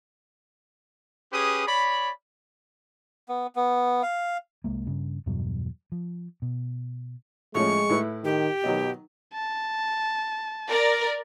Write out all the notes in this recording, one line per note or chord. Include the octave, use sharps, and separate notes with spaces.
C#4 G4 G#4 B4 D#6
C#5 D5 B5
B3
B3
F5
C2 G#3 A#3
G2 C#3
E2 G2 B2 F#3
F3
B2
A2 F3 G#3 C#4 C#6
A2 E4 B4
D#3 G4
B2 D#3 F#3 D#5
A5
A#4 D5